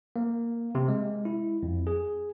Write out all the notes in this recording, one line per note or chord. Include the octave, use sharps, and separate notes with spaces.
A#3
C3
G#3
E4
F2
G#4